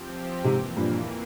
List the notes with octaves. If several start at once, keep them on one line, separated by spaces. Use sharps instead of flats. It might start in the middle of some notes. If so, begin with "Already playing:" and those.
Already playing: F3 C4 G4
F2 G#2 C3 E3 A#3
G2 A#2